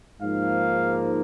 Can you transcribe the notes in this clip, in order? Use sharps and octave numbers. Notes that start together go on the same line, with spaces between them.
G#2 F3 A#3 F5